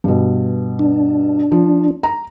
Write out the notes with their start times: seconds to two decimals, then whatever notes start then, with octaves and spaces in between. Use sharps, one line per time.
0.04 G2 B2
0.79 D4
1.52 F3
2.03 A#5